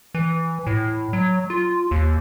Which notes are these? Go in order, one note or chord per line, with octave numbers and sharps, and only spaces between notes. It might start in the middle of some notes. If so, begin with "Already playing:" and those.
E3
A2
F#3
F4
D#2